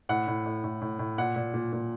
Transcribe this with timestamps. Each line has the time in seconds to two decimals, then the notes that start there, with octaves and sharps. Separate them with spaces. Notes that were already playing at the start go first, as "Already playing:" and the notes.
0.09 A2 F#5
0.27 A2
0.46 A2
0.64 A2
0.81 A2
0.99 A2
1.18 A#2 F#5
1.36 A#2
1.54 A#2
1.73 A#2